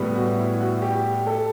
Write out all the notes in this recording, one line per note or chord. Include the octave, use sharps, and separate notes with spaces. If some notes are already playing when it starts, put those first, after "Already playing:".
Already playing: A2 G3 B3
F#4
E4
F#4
G4
A4